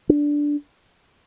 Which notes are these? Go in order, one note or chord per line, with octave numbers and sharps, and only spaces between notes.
D4